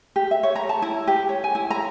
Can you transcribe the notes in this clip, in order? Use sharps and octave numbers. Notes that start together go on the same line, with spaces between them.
G4
E5
C#5
A#5
A5
E4
G4
C#5
G#5
E4
A#5